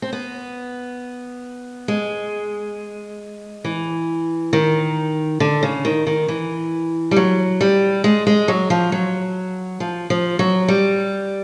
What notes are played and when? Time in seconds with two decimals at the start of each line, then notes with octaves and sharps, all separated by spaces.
0.02 C4
0.13 B3
1.88 G#3
3.64 E3
4.53 D#3
5.40 D3
5.63 C#3
5.85 D#3
6.07 D#3
6.28 E3
7.11 G3
7.16 F#3
7.61 G3
8.04 G#3
8.27 G#3
8.48 F#3
8.70 F3
8.92 F#3
9.80 F3
10.10 F3
10.39 F#3
10.68 G3